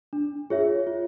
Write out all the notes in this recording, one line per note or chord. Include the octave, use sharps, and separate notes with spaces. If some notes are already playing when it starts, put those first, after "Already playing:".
D4
F4 G#4 C#5 E5
F4